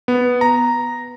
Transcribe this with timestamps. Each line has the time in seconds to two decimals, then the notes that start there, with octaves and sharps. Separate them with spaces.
0.08 B3
0.41 A#5